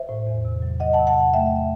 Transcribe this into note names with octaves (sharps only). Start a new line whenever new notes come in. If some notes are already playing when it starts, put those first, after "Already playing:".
Already playing: C5 E5
A2
E2
C3
F#3
E2 D#5 F#5
F#5 A5
C3
F#5 A5
E2
A3 E5 G5